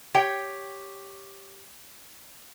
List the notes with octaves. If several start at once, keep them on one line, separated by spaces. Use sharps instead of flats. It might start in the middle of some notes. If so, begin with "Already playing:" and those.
G4 C#5 G5